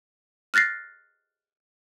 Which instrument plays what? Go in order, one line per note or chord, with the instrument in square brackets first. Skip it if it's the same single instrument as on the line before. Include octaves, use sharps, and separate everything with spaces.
[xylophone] F6 F#6 A6 A#6 C7